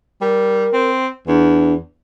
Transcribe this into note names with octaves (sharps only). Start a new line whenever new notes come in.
G3 A#4
C4
E2 D4